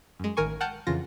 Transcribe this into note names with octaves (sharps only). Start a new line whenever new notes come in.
F#2 G#3
A1 D#3 A#4 G#5 C#6
F#5 G5 A5 F6 G6
F2 C#3 E3 F4 A#6